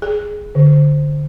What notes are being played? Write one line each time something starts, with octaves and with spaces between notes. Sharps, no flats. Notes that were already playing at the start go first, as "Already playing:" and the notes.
G#4
D3